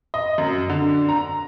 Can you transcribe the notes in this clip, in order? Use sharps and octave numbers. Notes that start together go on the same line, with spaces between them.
D#5
F#2
D3
A#5